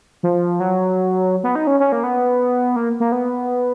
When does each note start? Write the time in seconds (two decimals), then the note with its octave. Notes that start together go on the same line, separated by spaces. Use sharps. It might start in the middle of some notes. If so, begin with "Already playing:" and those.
0.23 F3
0.60 F#3
1.44 B3
1.55 D#4
1.67 C#4
1.80 C#4
1.92 A#3
2.04 B3
2.76 A#3
3.00 A#3
3.12 B3